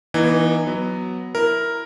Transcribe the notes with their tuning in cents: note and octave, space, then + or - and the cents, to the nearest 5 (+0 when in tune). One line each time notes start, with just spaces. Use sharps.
E3 -5 B3 -45 D#4 -20
F#3 +0 B3 +0
E4 +0 A#4 +0